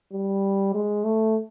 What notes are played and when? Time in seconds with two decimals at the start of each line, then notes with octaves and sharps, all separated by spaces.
0.13 G3
0.74 G#3
1.04 A3